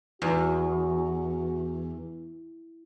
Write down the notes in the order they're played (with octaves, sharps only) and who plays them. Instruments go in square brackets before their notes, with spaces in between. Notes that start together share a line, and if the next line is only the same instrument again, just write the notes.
[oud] E2 [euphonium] F#4